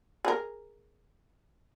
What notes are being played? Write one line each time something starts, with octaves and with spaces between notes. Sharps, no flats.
G#4 A#4